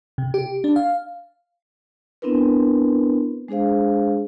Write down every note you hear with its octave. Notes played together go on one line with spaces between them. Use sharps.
C3
G4
D4
F5
B3 C4 D4 E4 A#4 B4
G#3 D4 G#4 C5 F5